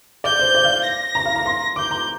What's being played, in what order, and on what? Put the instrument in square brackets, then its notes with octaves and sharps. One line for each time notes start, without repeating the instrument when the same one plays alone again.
[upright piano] D5 [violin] G6
[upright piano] C5
D5
F5
[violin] A#6
[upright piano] A#5
F5
A#5
C6
[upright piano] D6 [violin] G6
[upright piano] A#5